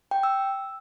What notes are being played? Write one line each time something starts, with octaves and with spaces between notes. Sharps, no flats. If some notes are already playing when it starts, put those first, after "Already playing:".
G5
E6